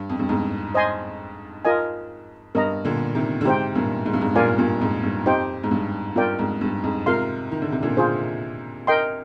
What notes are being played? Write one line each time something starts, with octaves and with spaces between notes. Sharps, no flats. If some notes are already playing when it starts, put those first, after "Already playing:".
Already playing: G2
F2
G2
F2 G#2
C5 D#5 G#5 C6
F4 A#4 D#5 G#5
G2 A#4 D#5 A#5
A#2 D3
C3 D#3
D3
G#2 C3 G4 C5 G5
G2 A#2
G#2
G2
F2 G#2
G2 A#2 F4 A#4 D5 F5 G#5
G2 A#2
F2 G#2
G2
F2 D#4 G4 C5 G5
G#2
G2
G2 F4 A#4 D5 G5
F2 G#2
G2
F2 G#2
G#2 C3 F4 A#4 F5 C6
D#3
D3
C3
A#2 D3
F4 G#4 C5
A#4 D#5 G5 C6